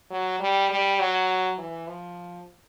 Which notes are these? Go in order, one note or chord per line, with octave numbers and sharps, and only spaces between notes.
F#3
G3
G3
F#3
E3
F3